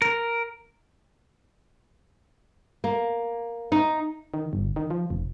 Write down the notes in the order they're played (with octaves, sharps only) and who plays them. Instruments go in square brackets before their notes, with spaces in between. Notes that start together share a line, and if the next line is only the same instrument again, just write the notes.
[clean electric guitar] A#4
[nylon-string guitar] A#3
D#4
[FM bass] D#3
G1
D#3
F3
F1